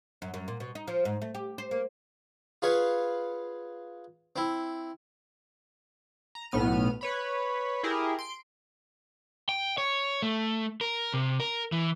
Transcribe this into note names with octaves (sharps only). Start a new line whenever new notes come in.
F#2
F#2
A#2
B2
D#4
F3
G#2
A3
G4
C5
A#3
F4 G#4 B4 C#5 F5 F#5
C4 E4
A#5
B1 A2 B3 F6 D#7
B4 C#5 B5
E4 G4 G#4 A#4
C6 D7
G5
C#5
A3
A#4
C3
A#4
E3